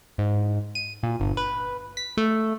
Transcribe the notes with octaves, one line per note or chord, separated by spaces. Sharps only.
G#2
D#7
A#2
G1
B4
B6
A3